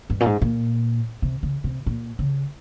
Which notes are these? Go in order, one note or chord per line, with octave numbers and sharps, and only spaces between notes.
G2
A#2
G#2
A#2
C3
C#3
C3
A#2
C#3